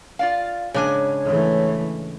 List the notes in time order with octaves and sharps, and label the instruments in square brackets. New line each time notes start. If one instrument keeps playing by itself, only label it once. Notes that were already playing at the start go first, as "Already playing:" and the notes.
[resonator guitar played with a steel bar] F4 D5 F5
[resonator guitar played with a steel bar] G#2 [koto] C#3 D4 G#5 [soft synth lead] C#5
[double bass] E3 A3